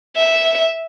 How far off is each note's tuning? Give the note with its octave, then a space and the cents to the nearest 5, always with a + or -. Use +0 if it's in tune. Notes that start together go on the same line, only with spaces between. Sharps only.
E5 -10